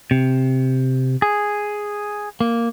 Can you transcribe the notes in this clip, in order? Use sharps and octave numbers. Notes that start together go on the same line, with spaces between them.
C3
G#4
A#3